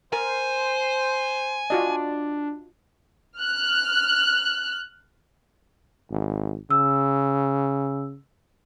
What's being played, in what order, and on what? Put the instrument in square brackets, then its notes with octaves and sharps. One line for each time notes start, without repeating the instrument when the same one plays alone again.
[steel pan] A#4 [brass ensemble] C5 [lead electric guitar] G#5
[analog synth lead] D4 [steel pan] F4 F#4 D#5
[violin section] F6 F#6
[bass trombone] G#1
[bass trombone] C#3 [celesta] E6